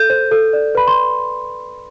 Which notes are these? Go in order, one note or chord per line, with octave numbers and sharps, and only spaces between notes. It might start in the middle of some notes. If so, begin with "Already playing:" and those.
Already playing: A4 G6
C5
A4
D5
B4 B5
C6